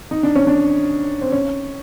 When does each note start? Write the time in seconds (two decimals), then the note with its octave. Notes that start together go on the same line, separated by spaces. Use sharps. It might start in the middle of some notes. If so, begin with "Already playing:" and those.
0.11 D#4
0.23 D4
0.35 C#4
0.47 D4
1.21 C4
1.32 C#4